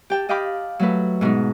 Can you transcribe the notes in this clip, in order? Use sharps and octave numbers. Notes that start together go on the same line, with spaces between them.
G4 G5 A5
G4 D#5 F5 G5 B5 D6
F#3 A3 B4
G#2 B2 G#3 D#4